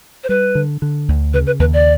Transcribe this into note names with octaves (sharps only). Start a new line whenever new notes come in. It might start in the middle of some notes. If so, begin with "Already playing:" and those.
C5
G3 B4
D3
D3
D2
C#3 B4
B4
D#2 B4
D5